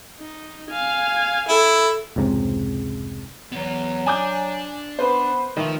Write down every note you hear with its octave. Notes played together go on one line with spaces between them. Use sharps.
D#4
F5 G#5
E4 A4
F1 C#2 G#2 C3
E2 F#3 B3
D4 G#5 D6 G6
B3 B4 C5
D#3 F3 A3